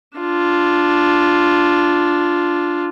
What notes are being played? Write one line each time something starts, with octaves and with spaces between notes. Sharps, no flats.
D4 F4